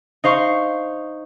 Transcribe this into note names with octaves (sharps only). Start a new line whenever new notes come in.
D#4 C5 F5 C#6